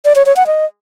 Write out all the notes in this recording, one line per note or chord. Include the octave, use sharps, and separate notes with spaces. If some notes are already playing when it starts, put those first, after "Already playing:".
D5
C#5
C#5
F#5
D#5